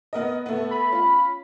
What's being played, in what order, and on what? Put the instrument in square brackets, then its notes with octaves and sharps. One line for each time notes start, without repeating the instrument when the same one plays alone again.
[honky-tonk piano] B3 A#4 D#5
A3 B3
[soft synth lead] B5
[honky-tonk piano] C#4 F4